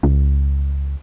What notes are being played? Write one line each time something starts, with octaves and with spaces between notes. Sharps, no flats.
C#2